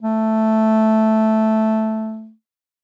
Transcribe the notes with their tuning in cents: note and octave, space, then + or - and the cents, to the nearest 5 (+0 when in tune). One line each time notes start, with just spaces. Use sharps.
A3 -5